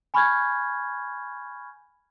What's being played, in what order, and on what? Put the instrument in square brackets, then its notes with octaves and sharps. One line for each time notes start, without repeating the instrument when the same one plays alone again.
[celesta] G#5 B5 C#6 F6 G6 G#6